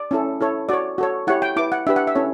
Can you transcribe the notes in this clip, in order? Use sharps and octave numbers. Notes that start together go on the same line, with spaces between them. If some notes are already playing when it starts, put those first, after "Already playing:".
Already playing: D5
C#4 E4 A4
E4 A4 C#5
F#4 C#5 D5
F#4 A4 C#5
E4 G4 C#5 F#5
G5
E4 B4 D6
F#5
D4 G4 B4 E5
F#5
E5
C#4 E4 A4 C#5